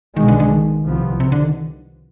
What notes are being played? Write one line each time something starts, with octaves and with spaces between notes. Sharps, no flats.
B1 B2 D#3 G#3
D3
D3
D#3
C2 C3 F3 B3
C3
D3
D#3